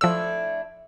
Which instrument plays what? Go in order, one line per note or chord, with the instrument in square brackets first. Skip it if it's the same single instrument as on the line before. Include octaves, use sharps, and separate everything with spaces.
[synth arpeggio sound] F3 E6 [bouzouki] A3 D4 E4